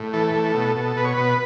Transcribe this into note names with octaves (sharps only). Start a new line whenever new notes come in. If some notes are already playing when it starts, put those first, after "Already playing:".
Already playing: A2
E3 A4
A2
B2
B2
B2 B4
C#5
B2 B4